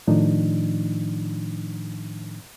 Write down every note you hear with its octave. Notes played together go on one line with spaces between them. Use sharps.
A2 D#3 F3 D4 D#4